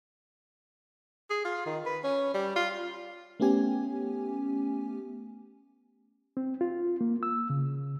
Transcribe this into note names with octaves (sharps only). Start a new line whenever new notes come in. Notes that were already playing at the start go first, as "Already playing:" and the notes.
G#4
F4
D#3
B4
C#4
G3
F4
A3 B3 C#4 G4 G#5
C4
F4
A#3
E6
C#3